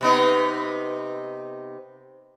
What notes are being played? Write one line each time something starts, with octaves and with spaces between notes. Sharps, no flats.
C3 B3 D#4